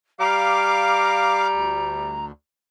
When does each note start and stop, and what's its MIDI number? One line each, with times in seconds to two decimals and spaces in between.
0.20 2.18 55
0.20 1.48 77
0.20 2.25 82
0.20 1.48 86
1.51 2.32 38